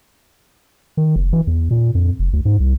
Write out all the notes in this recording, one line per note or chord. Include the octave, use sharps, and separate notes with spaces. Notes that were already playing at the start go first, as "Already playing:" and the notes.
D#3
F1
E3
E2
A#2
F2
F1
D2
G#2
C2